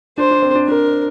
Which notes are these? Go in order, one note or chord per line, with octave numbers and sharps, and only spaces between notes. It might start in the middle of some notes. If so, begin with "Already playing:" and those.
D4 C5
D4
C4
D4
D4 A#4